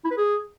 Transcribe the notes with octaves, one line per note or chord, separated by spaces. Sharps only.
E4
B4
G#4